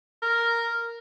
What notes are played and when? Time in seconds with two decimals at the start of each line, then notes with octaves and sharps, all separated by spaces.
0.22 A#4